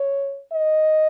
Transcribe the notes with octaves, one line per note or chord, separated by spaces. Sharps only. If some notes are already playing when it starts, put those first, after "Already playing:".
Already playing: C#5
D#5